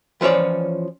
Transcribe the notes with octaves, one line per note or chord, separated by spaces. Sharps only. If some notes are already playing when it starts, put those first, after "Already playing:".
E3 F3 C#4 C#5 D5